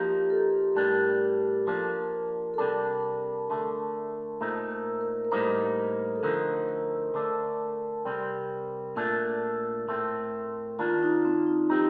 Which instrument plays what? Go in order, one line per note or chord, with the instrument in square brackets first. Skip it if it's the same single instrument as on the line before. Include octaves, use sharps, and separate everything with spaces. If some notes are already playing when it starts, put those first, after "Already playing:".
Already playing: [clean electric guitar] F3 A#3 D#4 [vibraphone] G4
[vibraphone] A4
[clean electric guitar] A2 G3 D4 [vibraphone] A#4
[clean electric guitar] F3 A#3 D4 [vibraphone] A#4
[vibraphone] A4
[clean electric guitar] C3 G3 D4 [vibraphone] A#4
[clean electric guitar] D3 A3 D4
[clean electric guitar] A#2 A3 D#4 [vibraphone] C5
[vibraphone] A#4
A#4
A#4
[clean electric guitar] A2 G3 A#3 D#4 [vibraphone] C5
[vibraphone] A4
[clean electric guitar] D3 F3 A3 D#4 [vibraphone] A#4
[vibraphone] A#4
[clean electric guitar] D3 A3 D4
C3 G3 C4
[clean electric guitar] A#2 A3 D4 [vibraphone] A#4
[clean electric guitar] A2 A3 C4
[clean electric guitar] D#3 A#3 D4 [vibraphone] F4
[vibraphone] F4
D#4
C4
D#4
[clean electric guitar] F3 C4 D#4 [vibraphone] G4